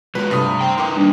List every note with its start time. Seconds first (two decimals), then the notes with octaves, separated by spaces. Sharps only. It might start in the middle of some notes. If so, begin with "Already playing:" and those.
0.15 F#3 G#3 F4 B4
0.31 G2 C3 A3 D#6
0.44 A#5
0.61 C5 G5
0.78 D#4 A#4 B4 C6 D6
0.97 G3 A#3 D4